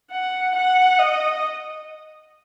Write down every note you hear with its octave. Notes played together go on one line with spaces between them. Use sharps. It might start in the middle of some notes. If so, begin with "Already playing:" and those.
F#5
F#5
D#5